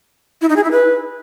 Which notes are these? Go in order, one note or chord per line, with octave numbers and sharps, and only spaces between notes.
E4
D#4
G#4
E4
B4